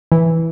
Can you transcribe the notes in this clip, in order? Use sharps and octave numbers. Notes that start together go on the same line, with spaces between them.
E3